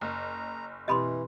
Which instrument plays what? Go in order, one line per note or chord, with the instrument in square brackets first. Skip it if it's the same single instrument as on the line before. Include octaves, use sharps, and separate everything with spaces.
[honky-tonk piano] F#1 [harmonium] A#5
[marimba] B2 C4 G4 [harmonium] E3 [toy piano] D#5 B5 C6